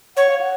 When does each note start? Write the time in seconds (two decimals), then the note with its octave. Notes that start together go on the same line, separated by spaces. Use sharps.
0.17 C#5 F#5
0.29 F5
0.41 F#5